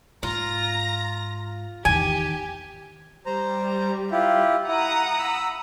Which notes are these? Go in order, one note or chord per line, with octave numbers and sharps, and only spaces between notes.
G#2 F4 A#5 A#6
E2 D#3 G4 G#5
G3 C5 A#5
E4 F4 G4
E4 F#5 A#5 D#6
B5 E6